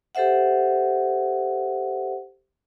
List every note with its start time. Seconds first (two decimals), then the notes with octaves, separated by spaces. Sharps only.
0.15 G4 A4 C5 E5 F#5